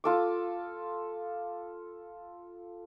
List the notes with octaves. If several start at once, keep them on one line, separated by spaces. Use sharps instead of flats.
F4 A4 D6